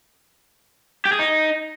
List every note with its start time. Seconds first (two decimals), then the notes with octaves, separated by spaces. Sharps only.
1.05 G4
1.12 G#4
1.19 D#4